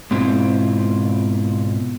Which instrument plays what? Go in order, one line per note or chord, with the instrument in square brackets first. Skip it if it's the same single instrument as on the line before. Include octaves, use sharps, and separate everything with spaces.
[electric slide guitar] G#2 B2 C4 E4 F4